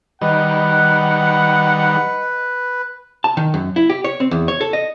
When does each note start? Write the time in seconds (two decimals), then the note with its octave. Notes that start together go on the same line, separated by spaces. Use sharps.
0.21 D#3 G3 B4 D#5 F#5
3.24 A5
3.37 D#3
3.54 F#2
3.76 E4
3.90 G4
4.04 C#5
4.20 C4
4.31 E2
4.48 C#5
4.61 A4
4.73 D#5